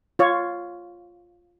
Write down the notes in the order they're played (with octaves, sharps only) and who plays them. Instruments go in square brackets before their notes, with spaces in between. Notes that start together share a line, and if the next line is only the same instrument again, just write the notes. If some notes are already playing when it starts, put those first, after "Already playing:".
[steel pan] F4 C#5